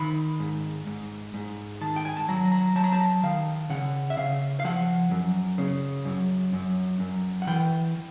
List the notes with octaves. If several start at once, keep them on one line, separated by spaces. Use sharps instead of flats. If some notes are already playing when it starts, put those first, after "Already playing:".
Already playing: D#3 B5
G#2
G#2
G#2
D#3 A5
G5
G#5
A5
F#3 A#5
A#5
F#3 A5
A#5
A5
D#3 F5
C#3 F#5
E5
C#3 F5
F5
F3 F#5
F#2
C#3
F#2
F#2
F#2
F#5
E3 G5